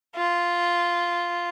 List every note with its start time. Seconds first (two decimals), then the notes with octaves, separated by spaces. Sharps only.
0.15 F4